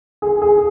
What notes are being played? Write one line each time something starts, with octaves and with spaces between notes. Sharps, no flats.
G#4
G#4